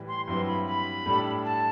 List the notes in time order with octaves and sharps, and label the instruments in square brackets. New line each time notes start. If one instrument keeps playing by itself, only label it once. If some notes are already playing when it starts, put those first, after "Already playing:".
Already playing: [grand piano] A2 E3 G3
[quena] C6
[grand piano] G2 F#3 C4 E4 B4 [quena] C6
[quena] B5
B5
[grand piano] A2 G3 D4 A4
[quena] A5